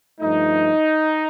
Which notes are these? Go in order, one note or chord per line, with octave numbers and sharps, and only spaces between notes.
G2 F3 A3 D#4